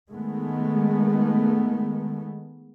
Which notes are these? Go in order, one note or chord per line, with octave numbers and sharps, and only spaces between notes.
D#3 G#3 A3 B3